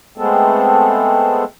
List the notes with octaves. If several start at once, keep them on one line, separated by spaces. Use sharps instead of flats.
G#3 A3 B3 C4 A4